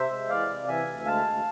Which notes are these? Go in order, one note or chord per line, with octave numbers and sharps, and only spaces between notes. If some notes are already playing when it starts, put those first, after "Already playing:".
Already playing: C3 C5 E5
G#3
E3 D5 F5
C3
E3 E5 G#5
D2
G#3 F5 A5
D2